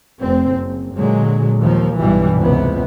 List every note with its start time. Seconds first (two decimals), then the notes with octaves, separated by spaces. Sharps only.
0.20 F1 C4
0.52 F#1
0.96 A#2 D3 F#3 G#3
1.61 D#2 D#3 F3
1.99 B1 G2 B2 E3 G3
2.38 F1 C#2 C3 B3